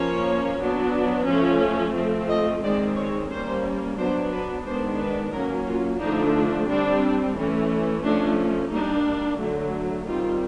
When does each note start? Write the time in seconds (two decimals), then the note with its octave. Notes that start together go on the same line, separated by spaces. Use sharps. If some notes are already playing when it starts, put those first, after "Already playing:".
Already playing: F3 A#3 C#4 C#5
0.59 F#3 B3 D4
1.27 F3 A3 C#4
1.95 F3 A3 C4
2.29 D#5
2.63 D#3 G#3 C4 D5
2.96 C#5
3.30 G3 A#3 C#4 C5
3.98 F#3 B3 D4 C5
4.31 B4
4.65 D#3 G#3 B3 D4 C5
4.99 B4
5.33 F#3 A#3 C#4 A#4
5.67 F4
6.00 D3 F3 A3 D4 D#4
6.68 G3 C4 D4
7.36 E3 A3 C#4
8.03 F3 A3 C#4 D4
8.71 G3 A#3 D4 D#4
9.39 D3 F#3 A3
10.06 D#3 G3 C4 F4